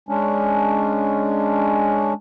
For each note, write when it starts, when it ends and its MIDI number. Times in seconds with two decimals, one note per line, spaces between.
0.09 2.13 56
0.09 2.13 61
0.09 2.13 62